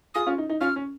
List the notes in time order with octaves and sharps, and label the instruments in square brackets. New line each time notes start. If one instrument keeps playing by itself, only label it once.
[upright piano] F4 G#4 [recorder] D#6
[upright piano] C#4 F4
D#4
D#4
[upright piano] C#4 F4 [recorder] F6
[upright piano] C#4